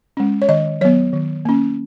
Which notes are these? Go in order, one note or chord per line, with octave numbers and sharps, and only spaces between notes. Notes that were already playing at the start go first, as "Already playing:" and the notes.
G#3 C#4
C#5
D#3 D#5
F#3 B3 C#5
D#3
A#3 C#4